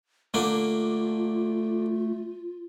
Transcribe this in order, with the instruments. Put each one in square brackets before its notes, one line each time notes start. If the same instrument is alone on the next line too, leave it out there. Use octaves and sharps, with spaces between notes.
[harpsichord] D3 A#3 D4 [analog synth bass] A3 [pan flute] F4